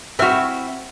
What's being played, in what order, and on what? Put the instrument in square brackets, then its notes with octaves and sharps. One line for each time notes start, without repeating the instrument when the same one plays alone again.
[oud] C4 F#4 [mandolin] E4 E5 F6